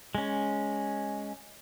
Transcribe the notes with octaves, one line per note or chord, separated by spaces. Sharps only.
G#3 C#4